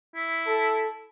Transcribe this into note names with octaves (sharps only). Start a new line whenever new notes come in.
E4
A4